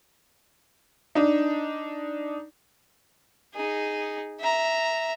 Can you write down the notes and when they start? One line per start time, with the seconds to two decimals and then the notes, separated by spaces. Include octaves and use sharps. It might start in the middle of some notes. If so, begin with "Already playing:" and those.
1.15 D4 D#4
3.54 D#4 G#4
4.40 E5 A#5